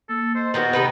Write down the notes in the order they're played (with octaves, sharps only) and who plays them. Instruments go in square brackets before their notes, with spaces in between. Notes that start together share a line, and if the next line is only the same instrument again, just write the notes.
[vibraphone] A#3 [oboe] A4
[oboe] C5 [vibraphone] D#5
[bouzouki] D#3 B3 F#4 [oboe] G5
[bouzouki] C3 D#4 B4